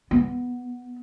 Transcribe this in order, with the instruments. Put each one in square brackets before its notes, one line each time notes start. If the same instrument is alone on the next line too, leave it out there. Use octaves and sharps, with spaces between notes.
[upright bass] B3